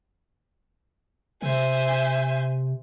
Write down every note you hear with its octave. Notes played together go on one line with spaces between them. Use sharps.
C3 C5 E5 G#5